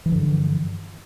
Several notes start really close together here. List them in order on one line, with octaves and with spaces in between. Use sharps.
E3 F3 D3 G2